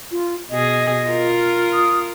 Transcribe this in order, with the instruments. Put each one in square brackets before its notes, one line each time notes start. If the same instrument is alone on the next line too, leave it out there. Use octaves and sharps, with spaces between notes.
[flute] F4
[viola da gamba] B2 G#4 [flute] D#5
[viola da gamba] F4 A#4
[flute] D#6